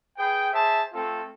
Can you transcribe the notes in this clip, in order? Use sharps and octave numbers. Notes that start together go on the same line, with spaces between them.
G#4 B4 G5
G#4 C5 E5 A5
A3 C4 F4 A4